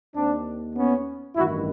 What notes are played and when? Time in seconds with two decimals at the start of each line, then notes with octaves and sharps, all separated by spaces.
0.16 D#2 D#3 C4 D4
0.76 B3 C#4
1.36 A1 G2 D#3 E4 F#4